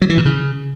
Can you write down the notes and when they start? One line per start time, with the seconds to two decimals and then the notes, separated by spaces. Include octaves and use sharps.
0.02 F#3
0.09 E3
0.17 A#2
0.25 C#3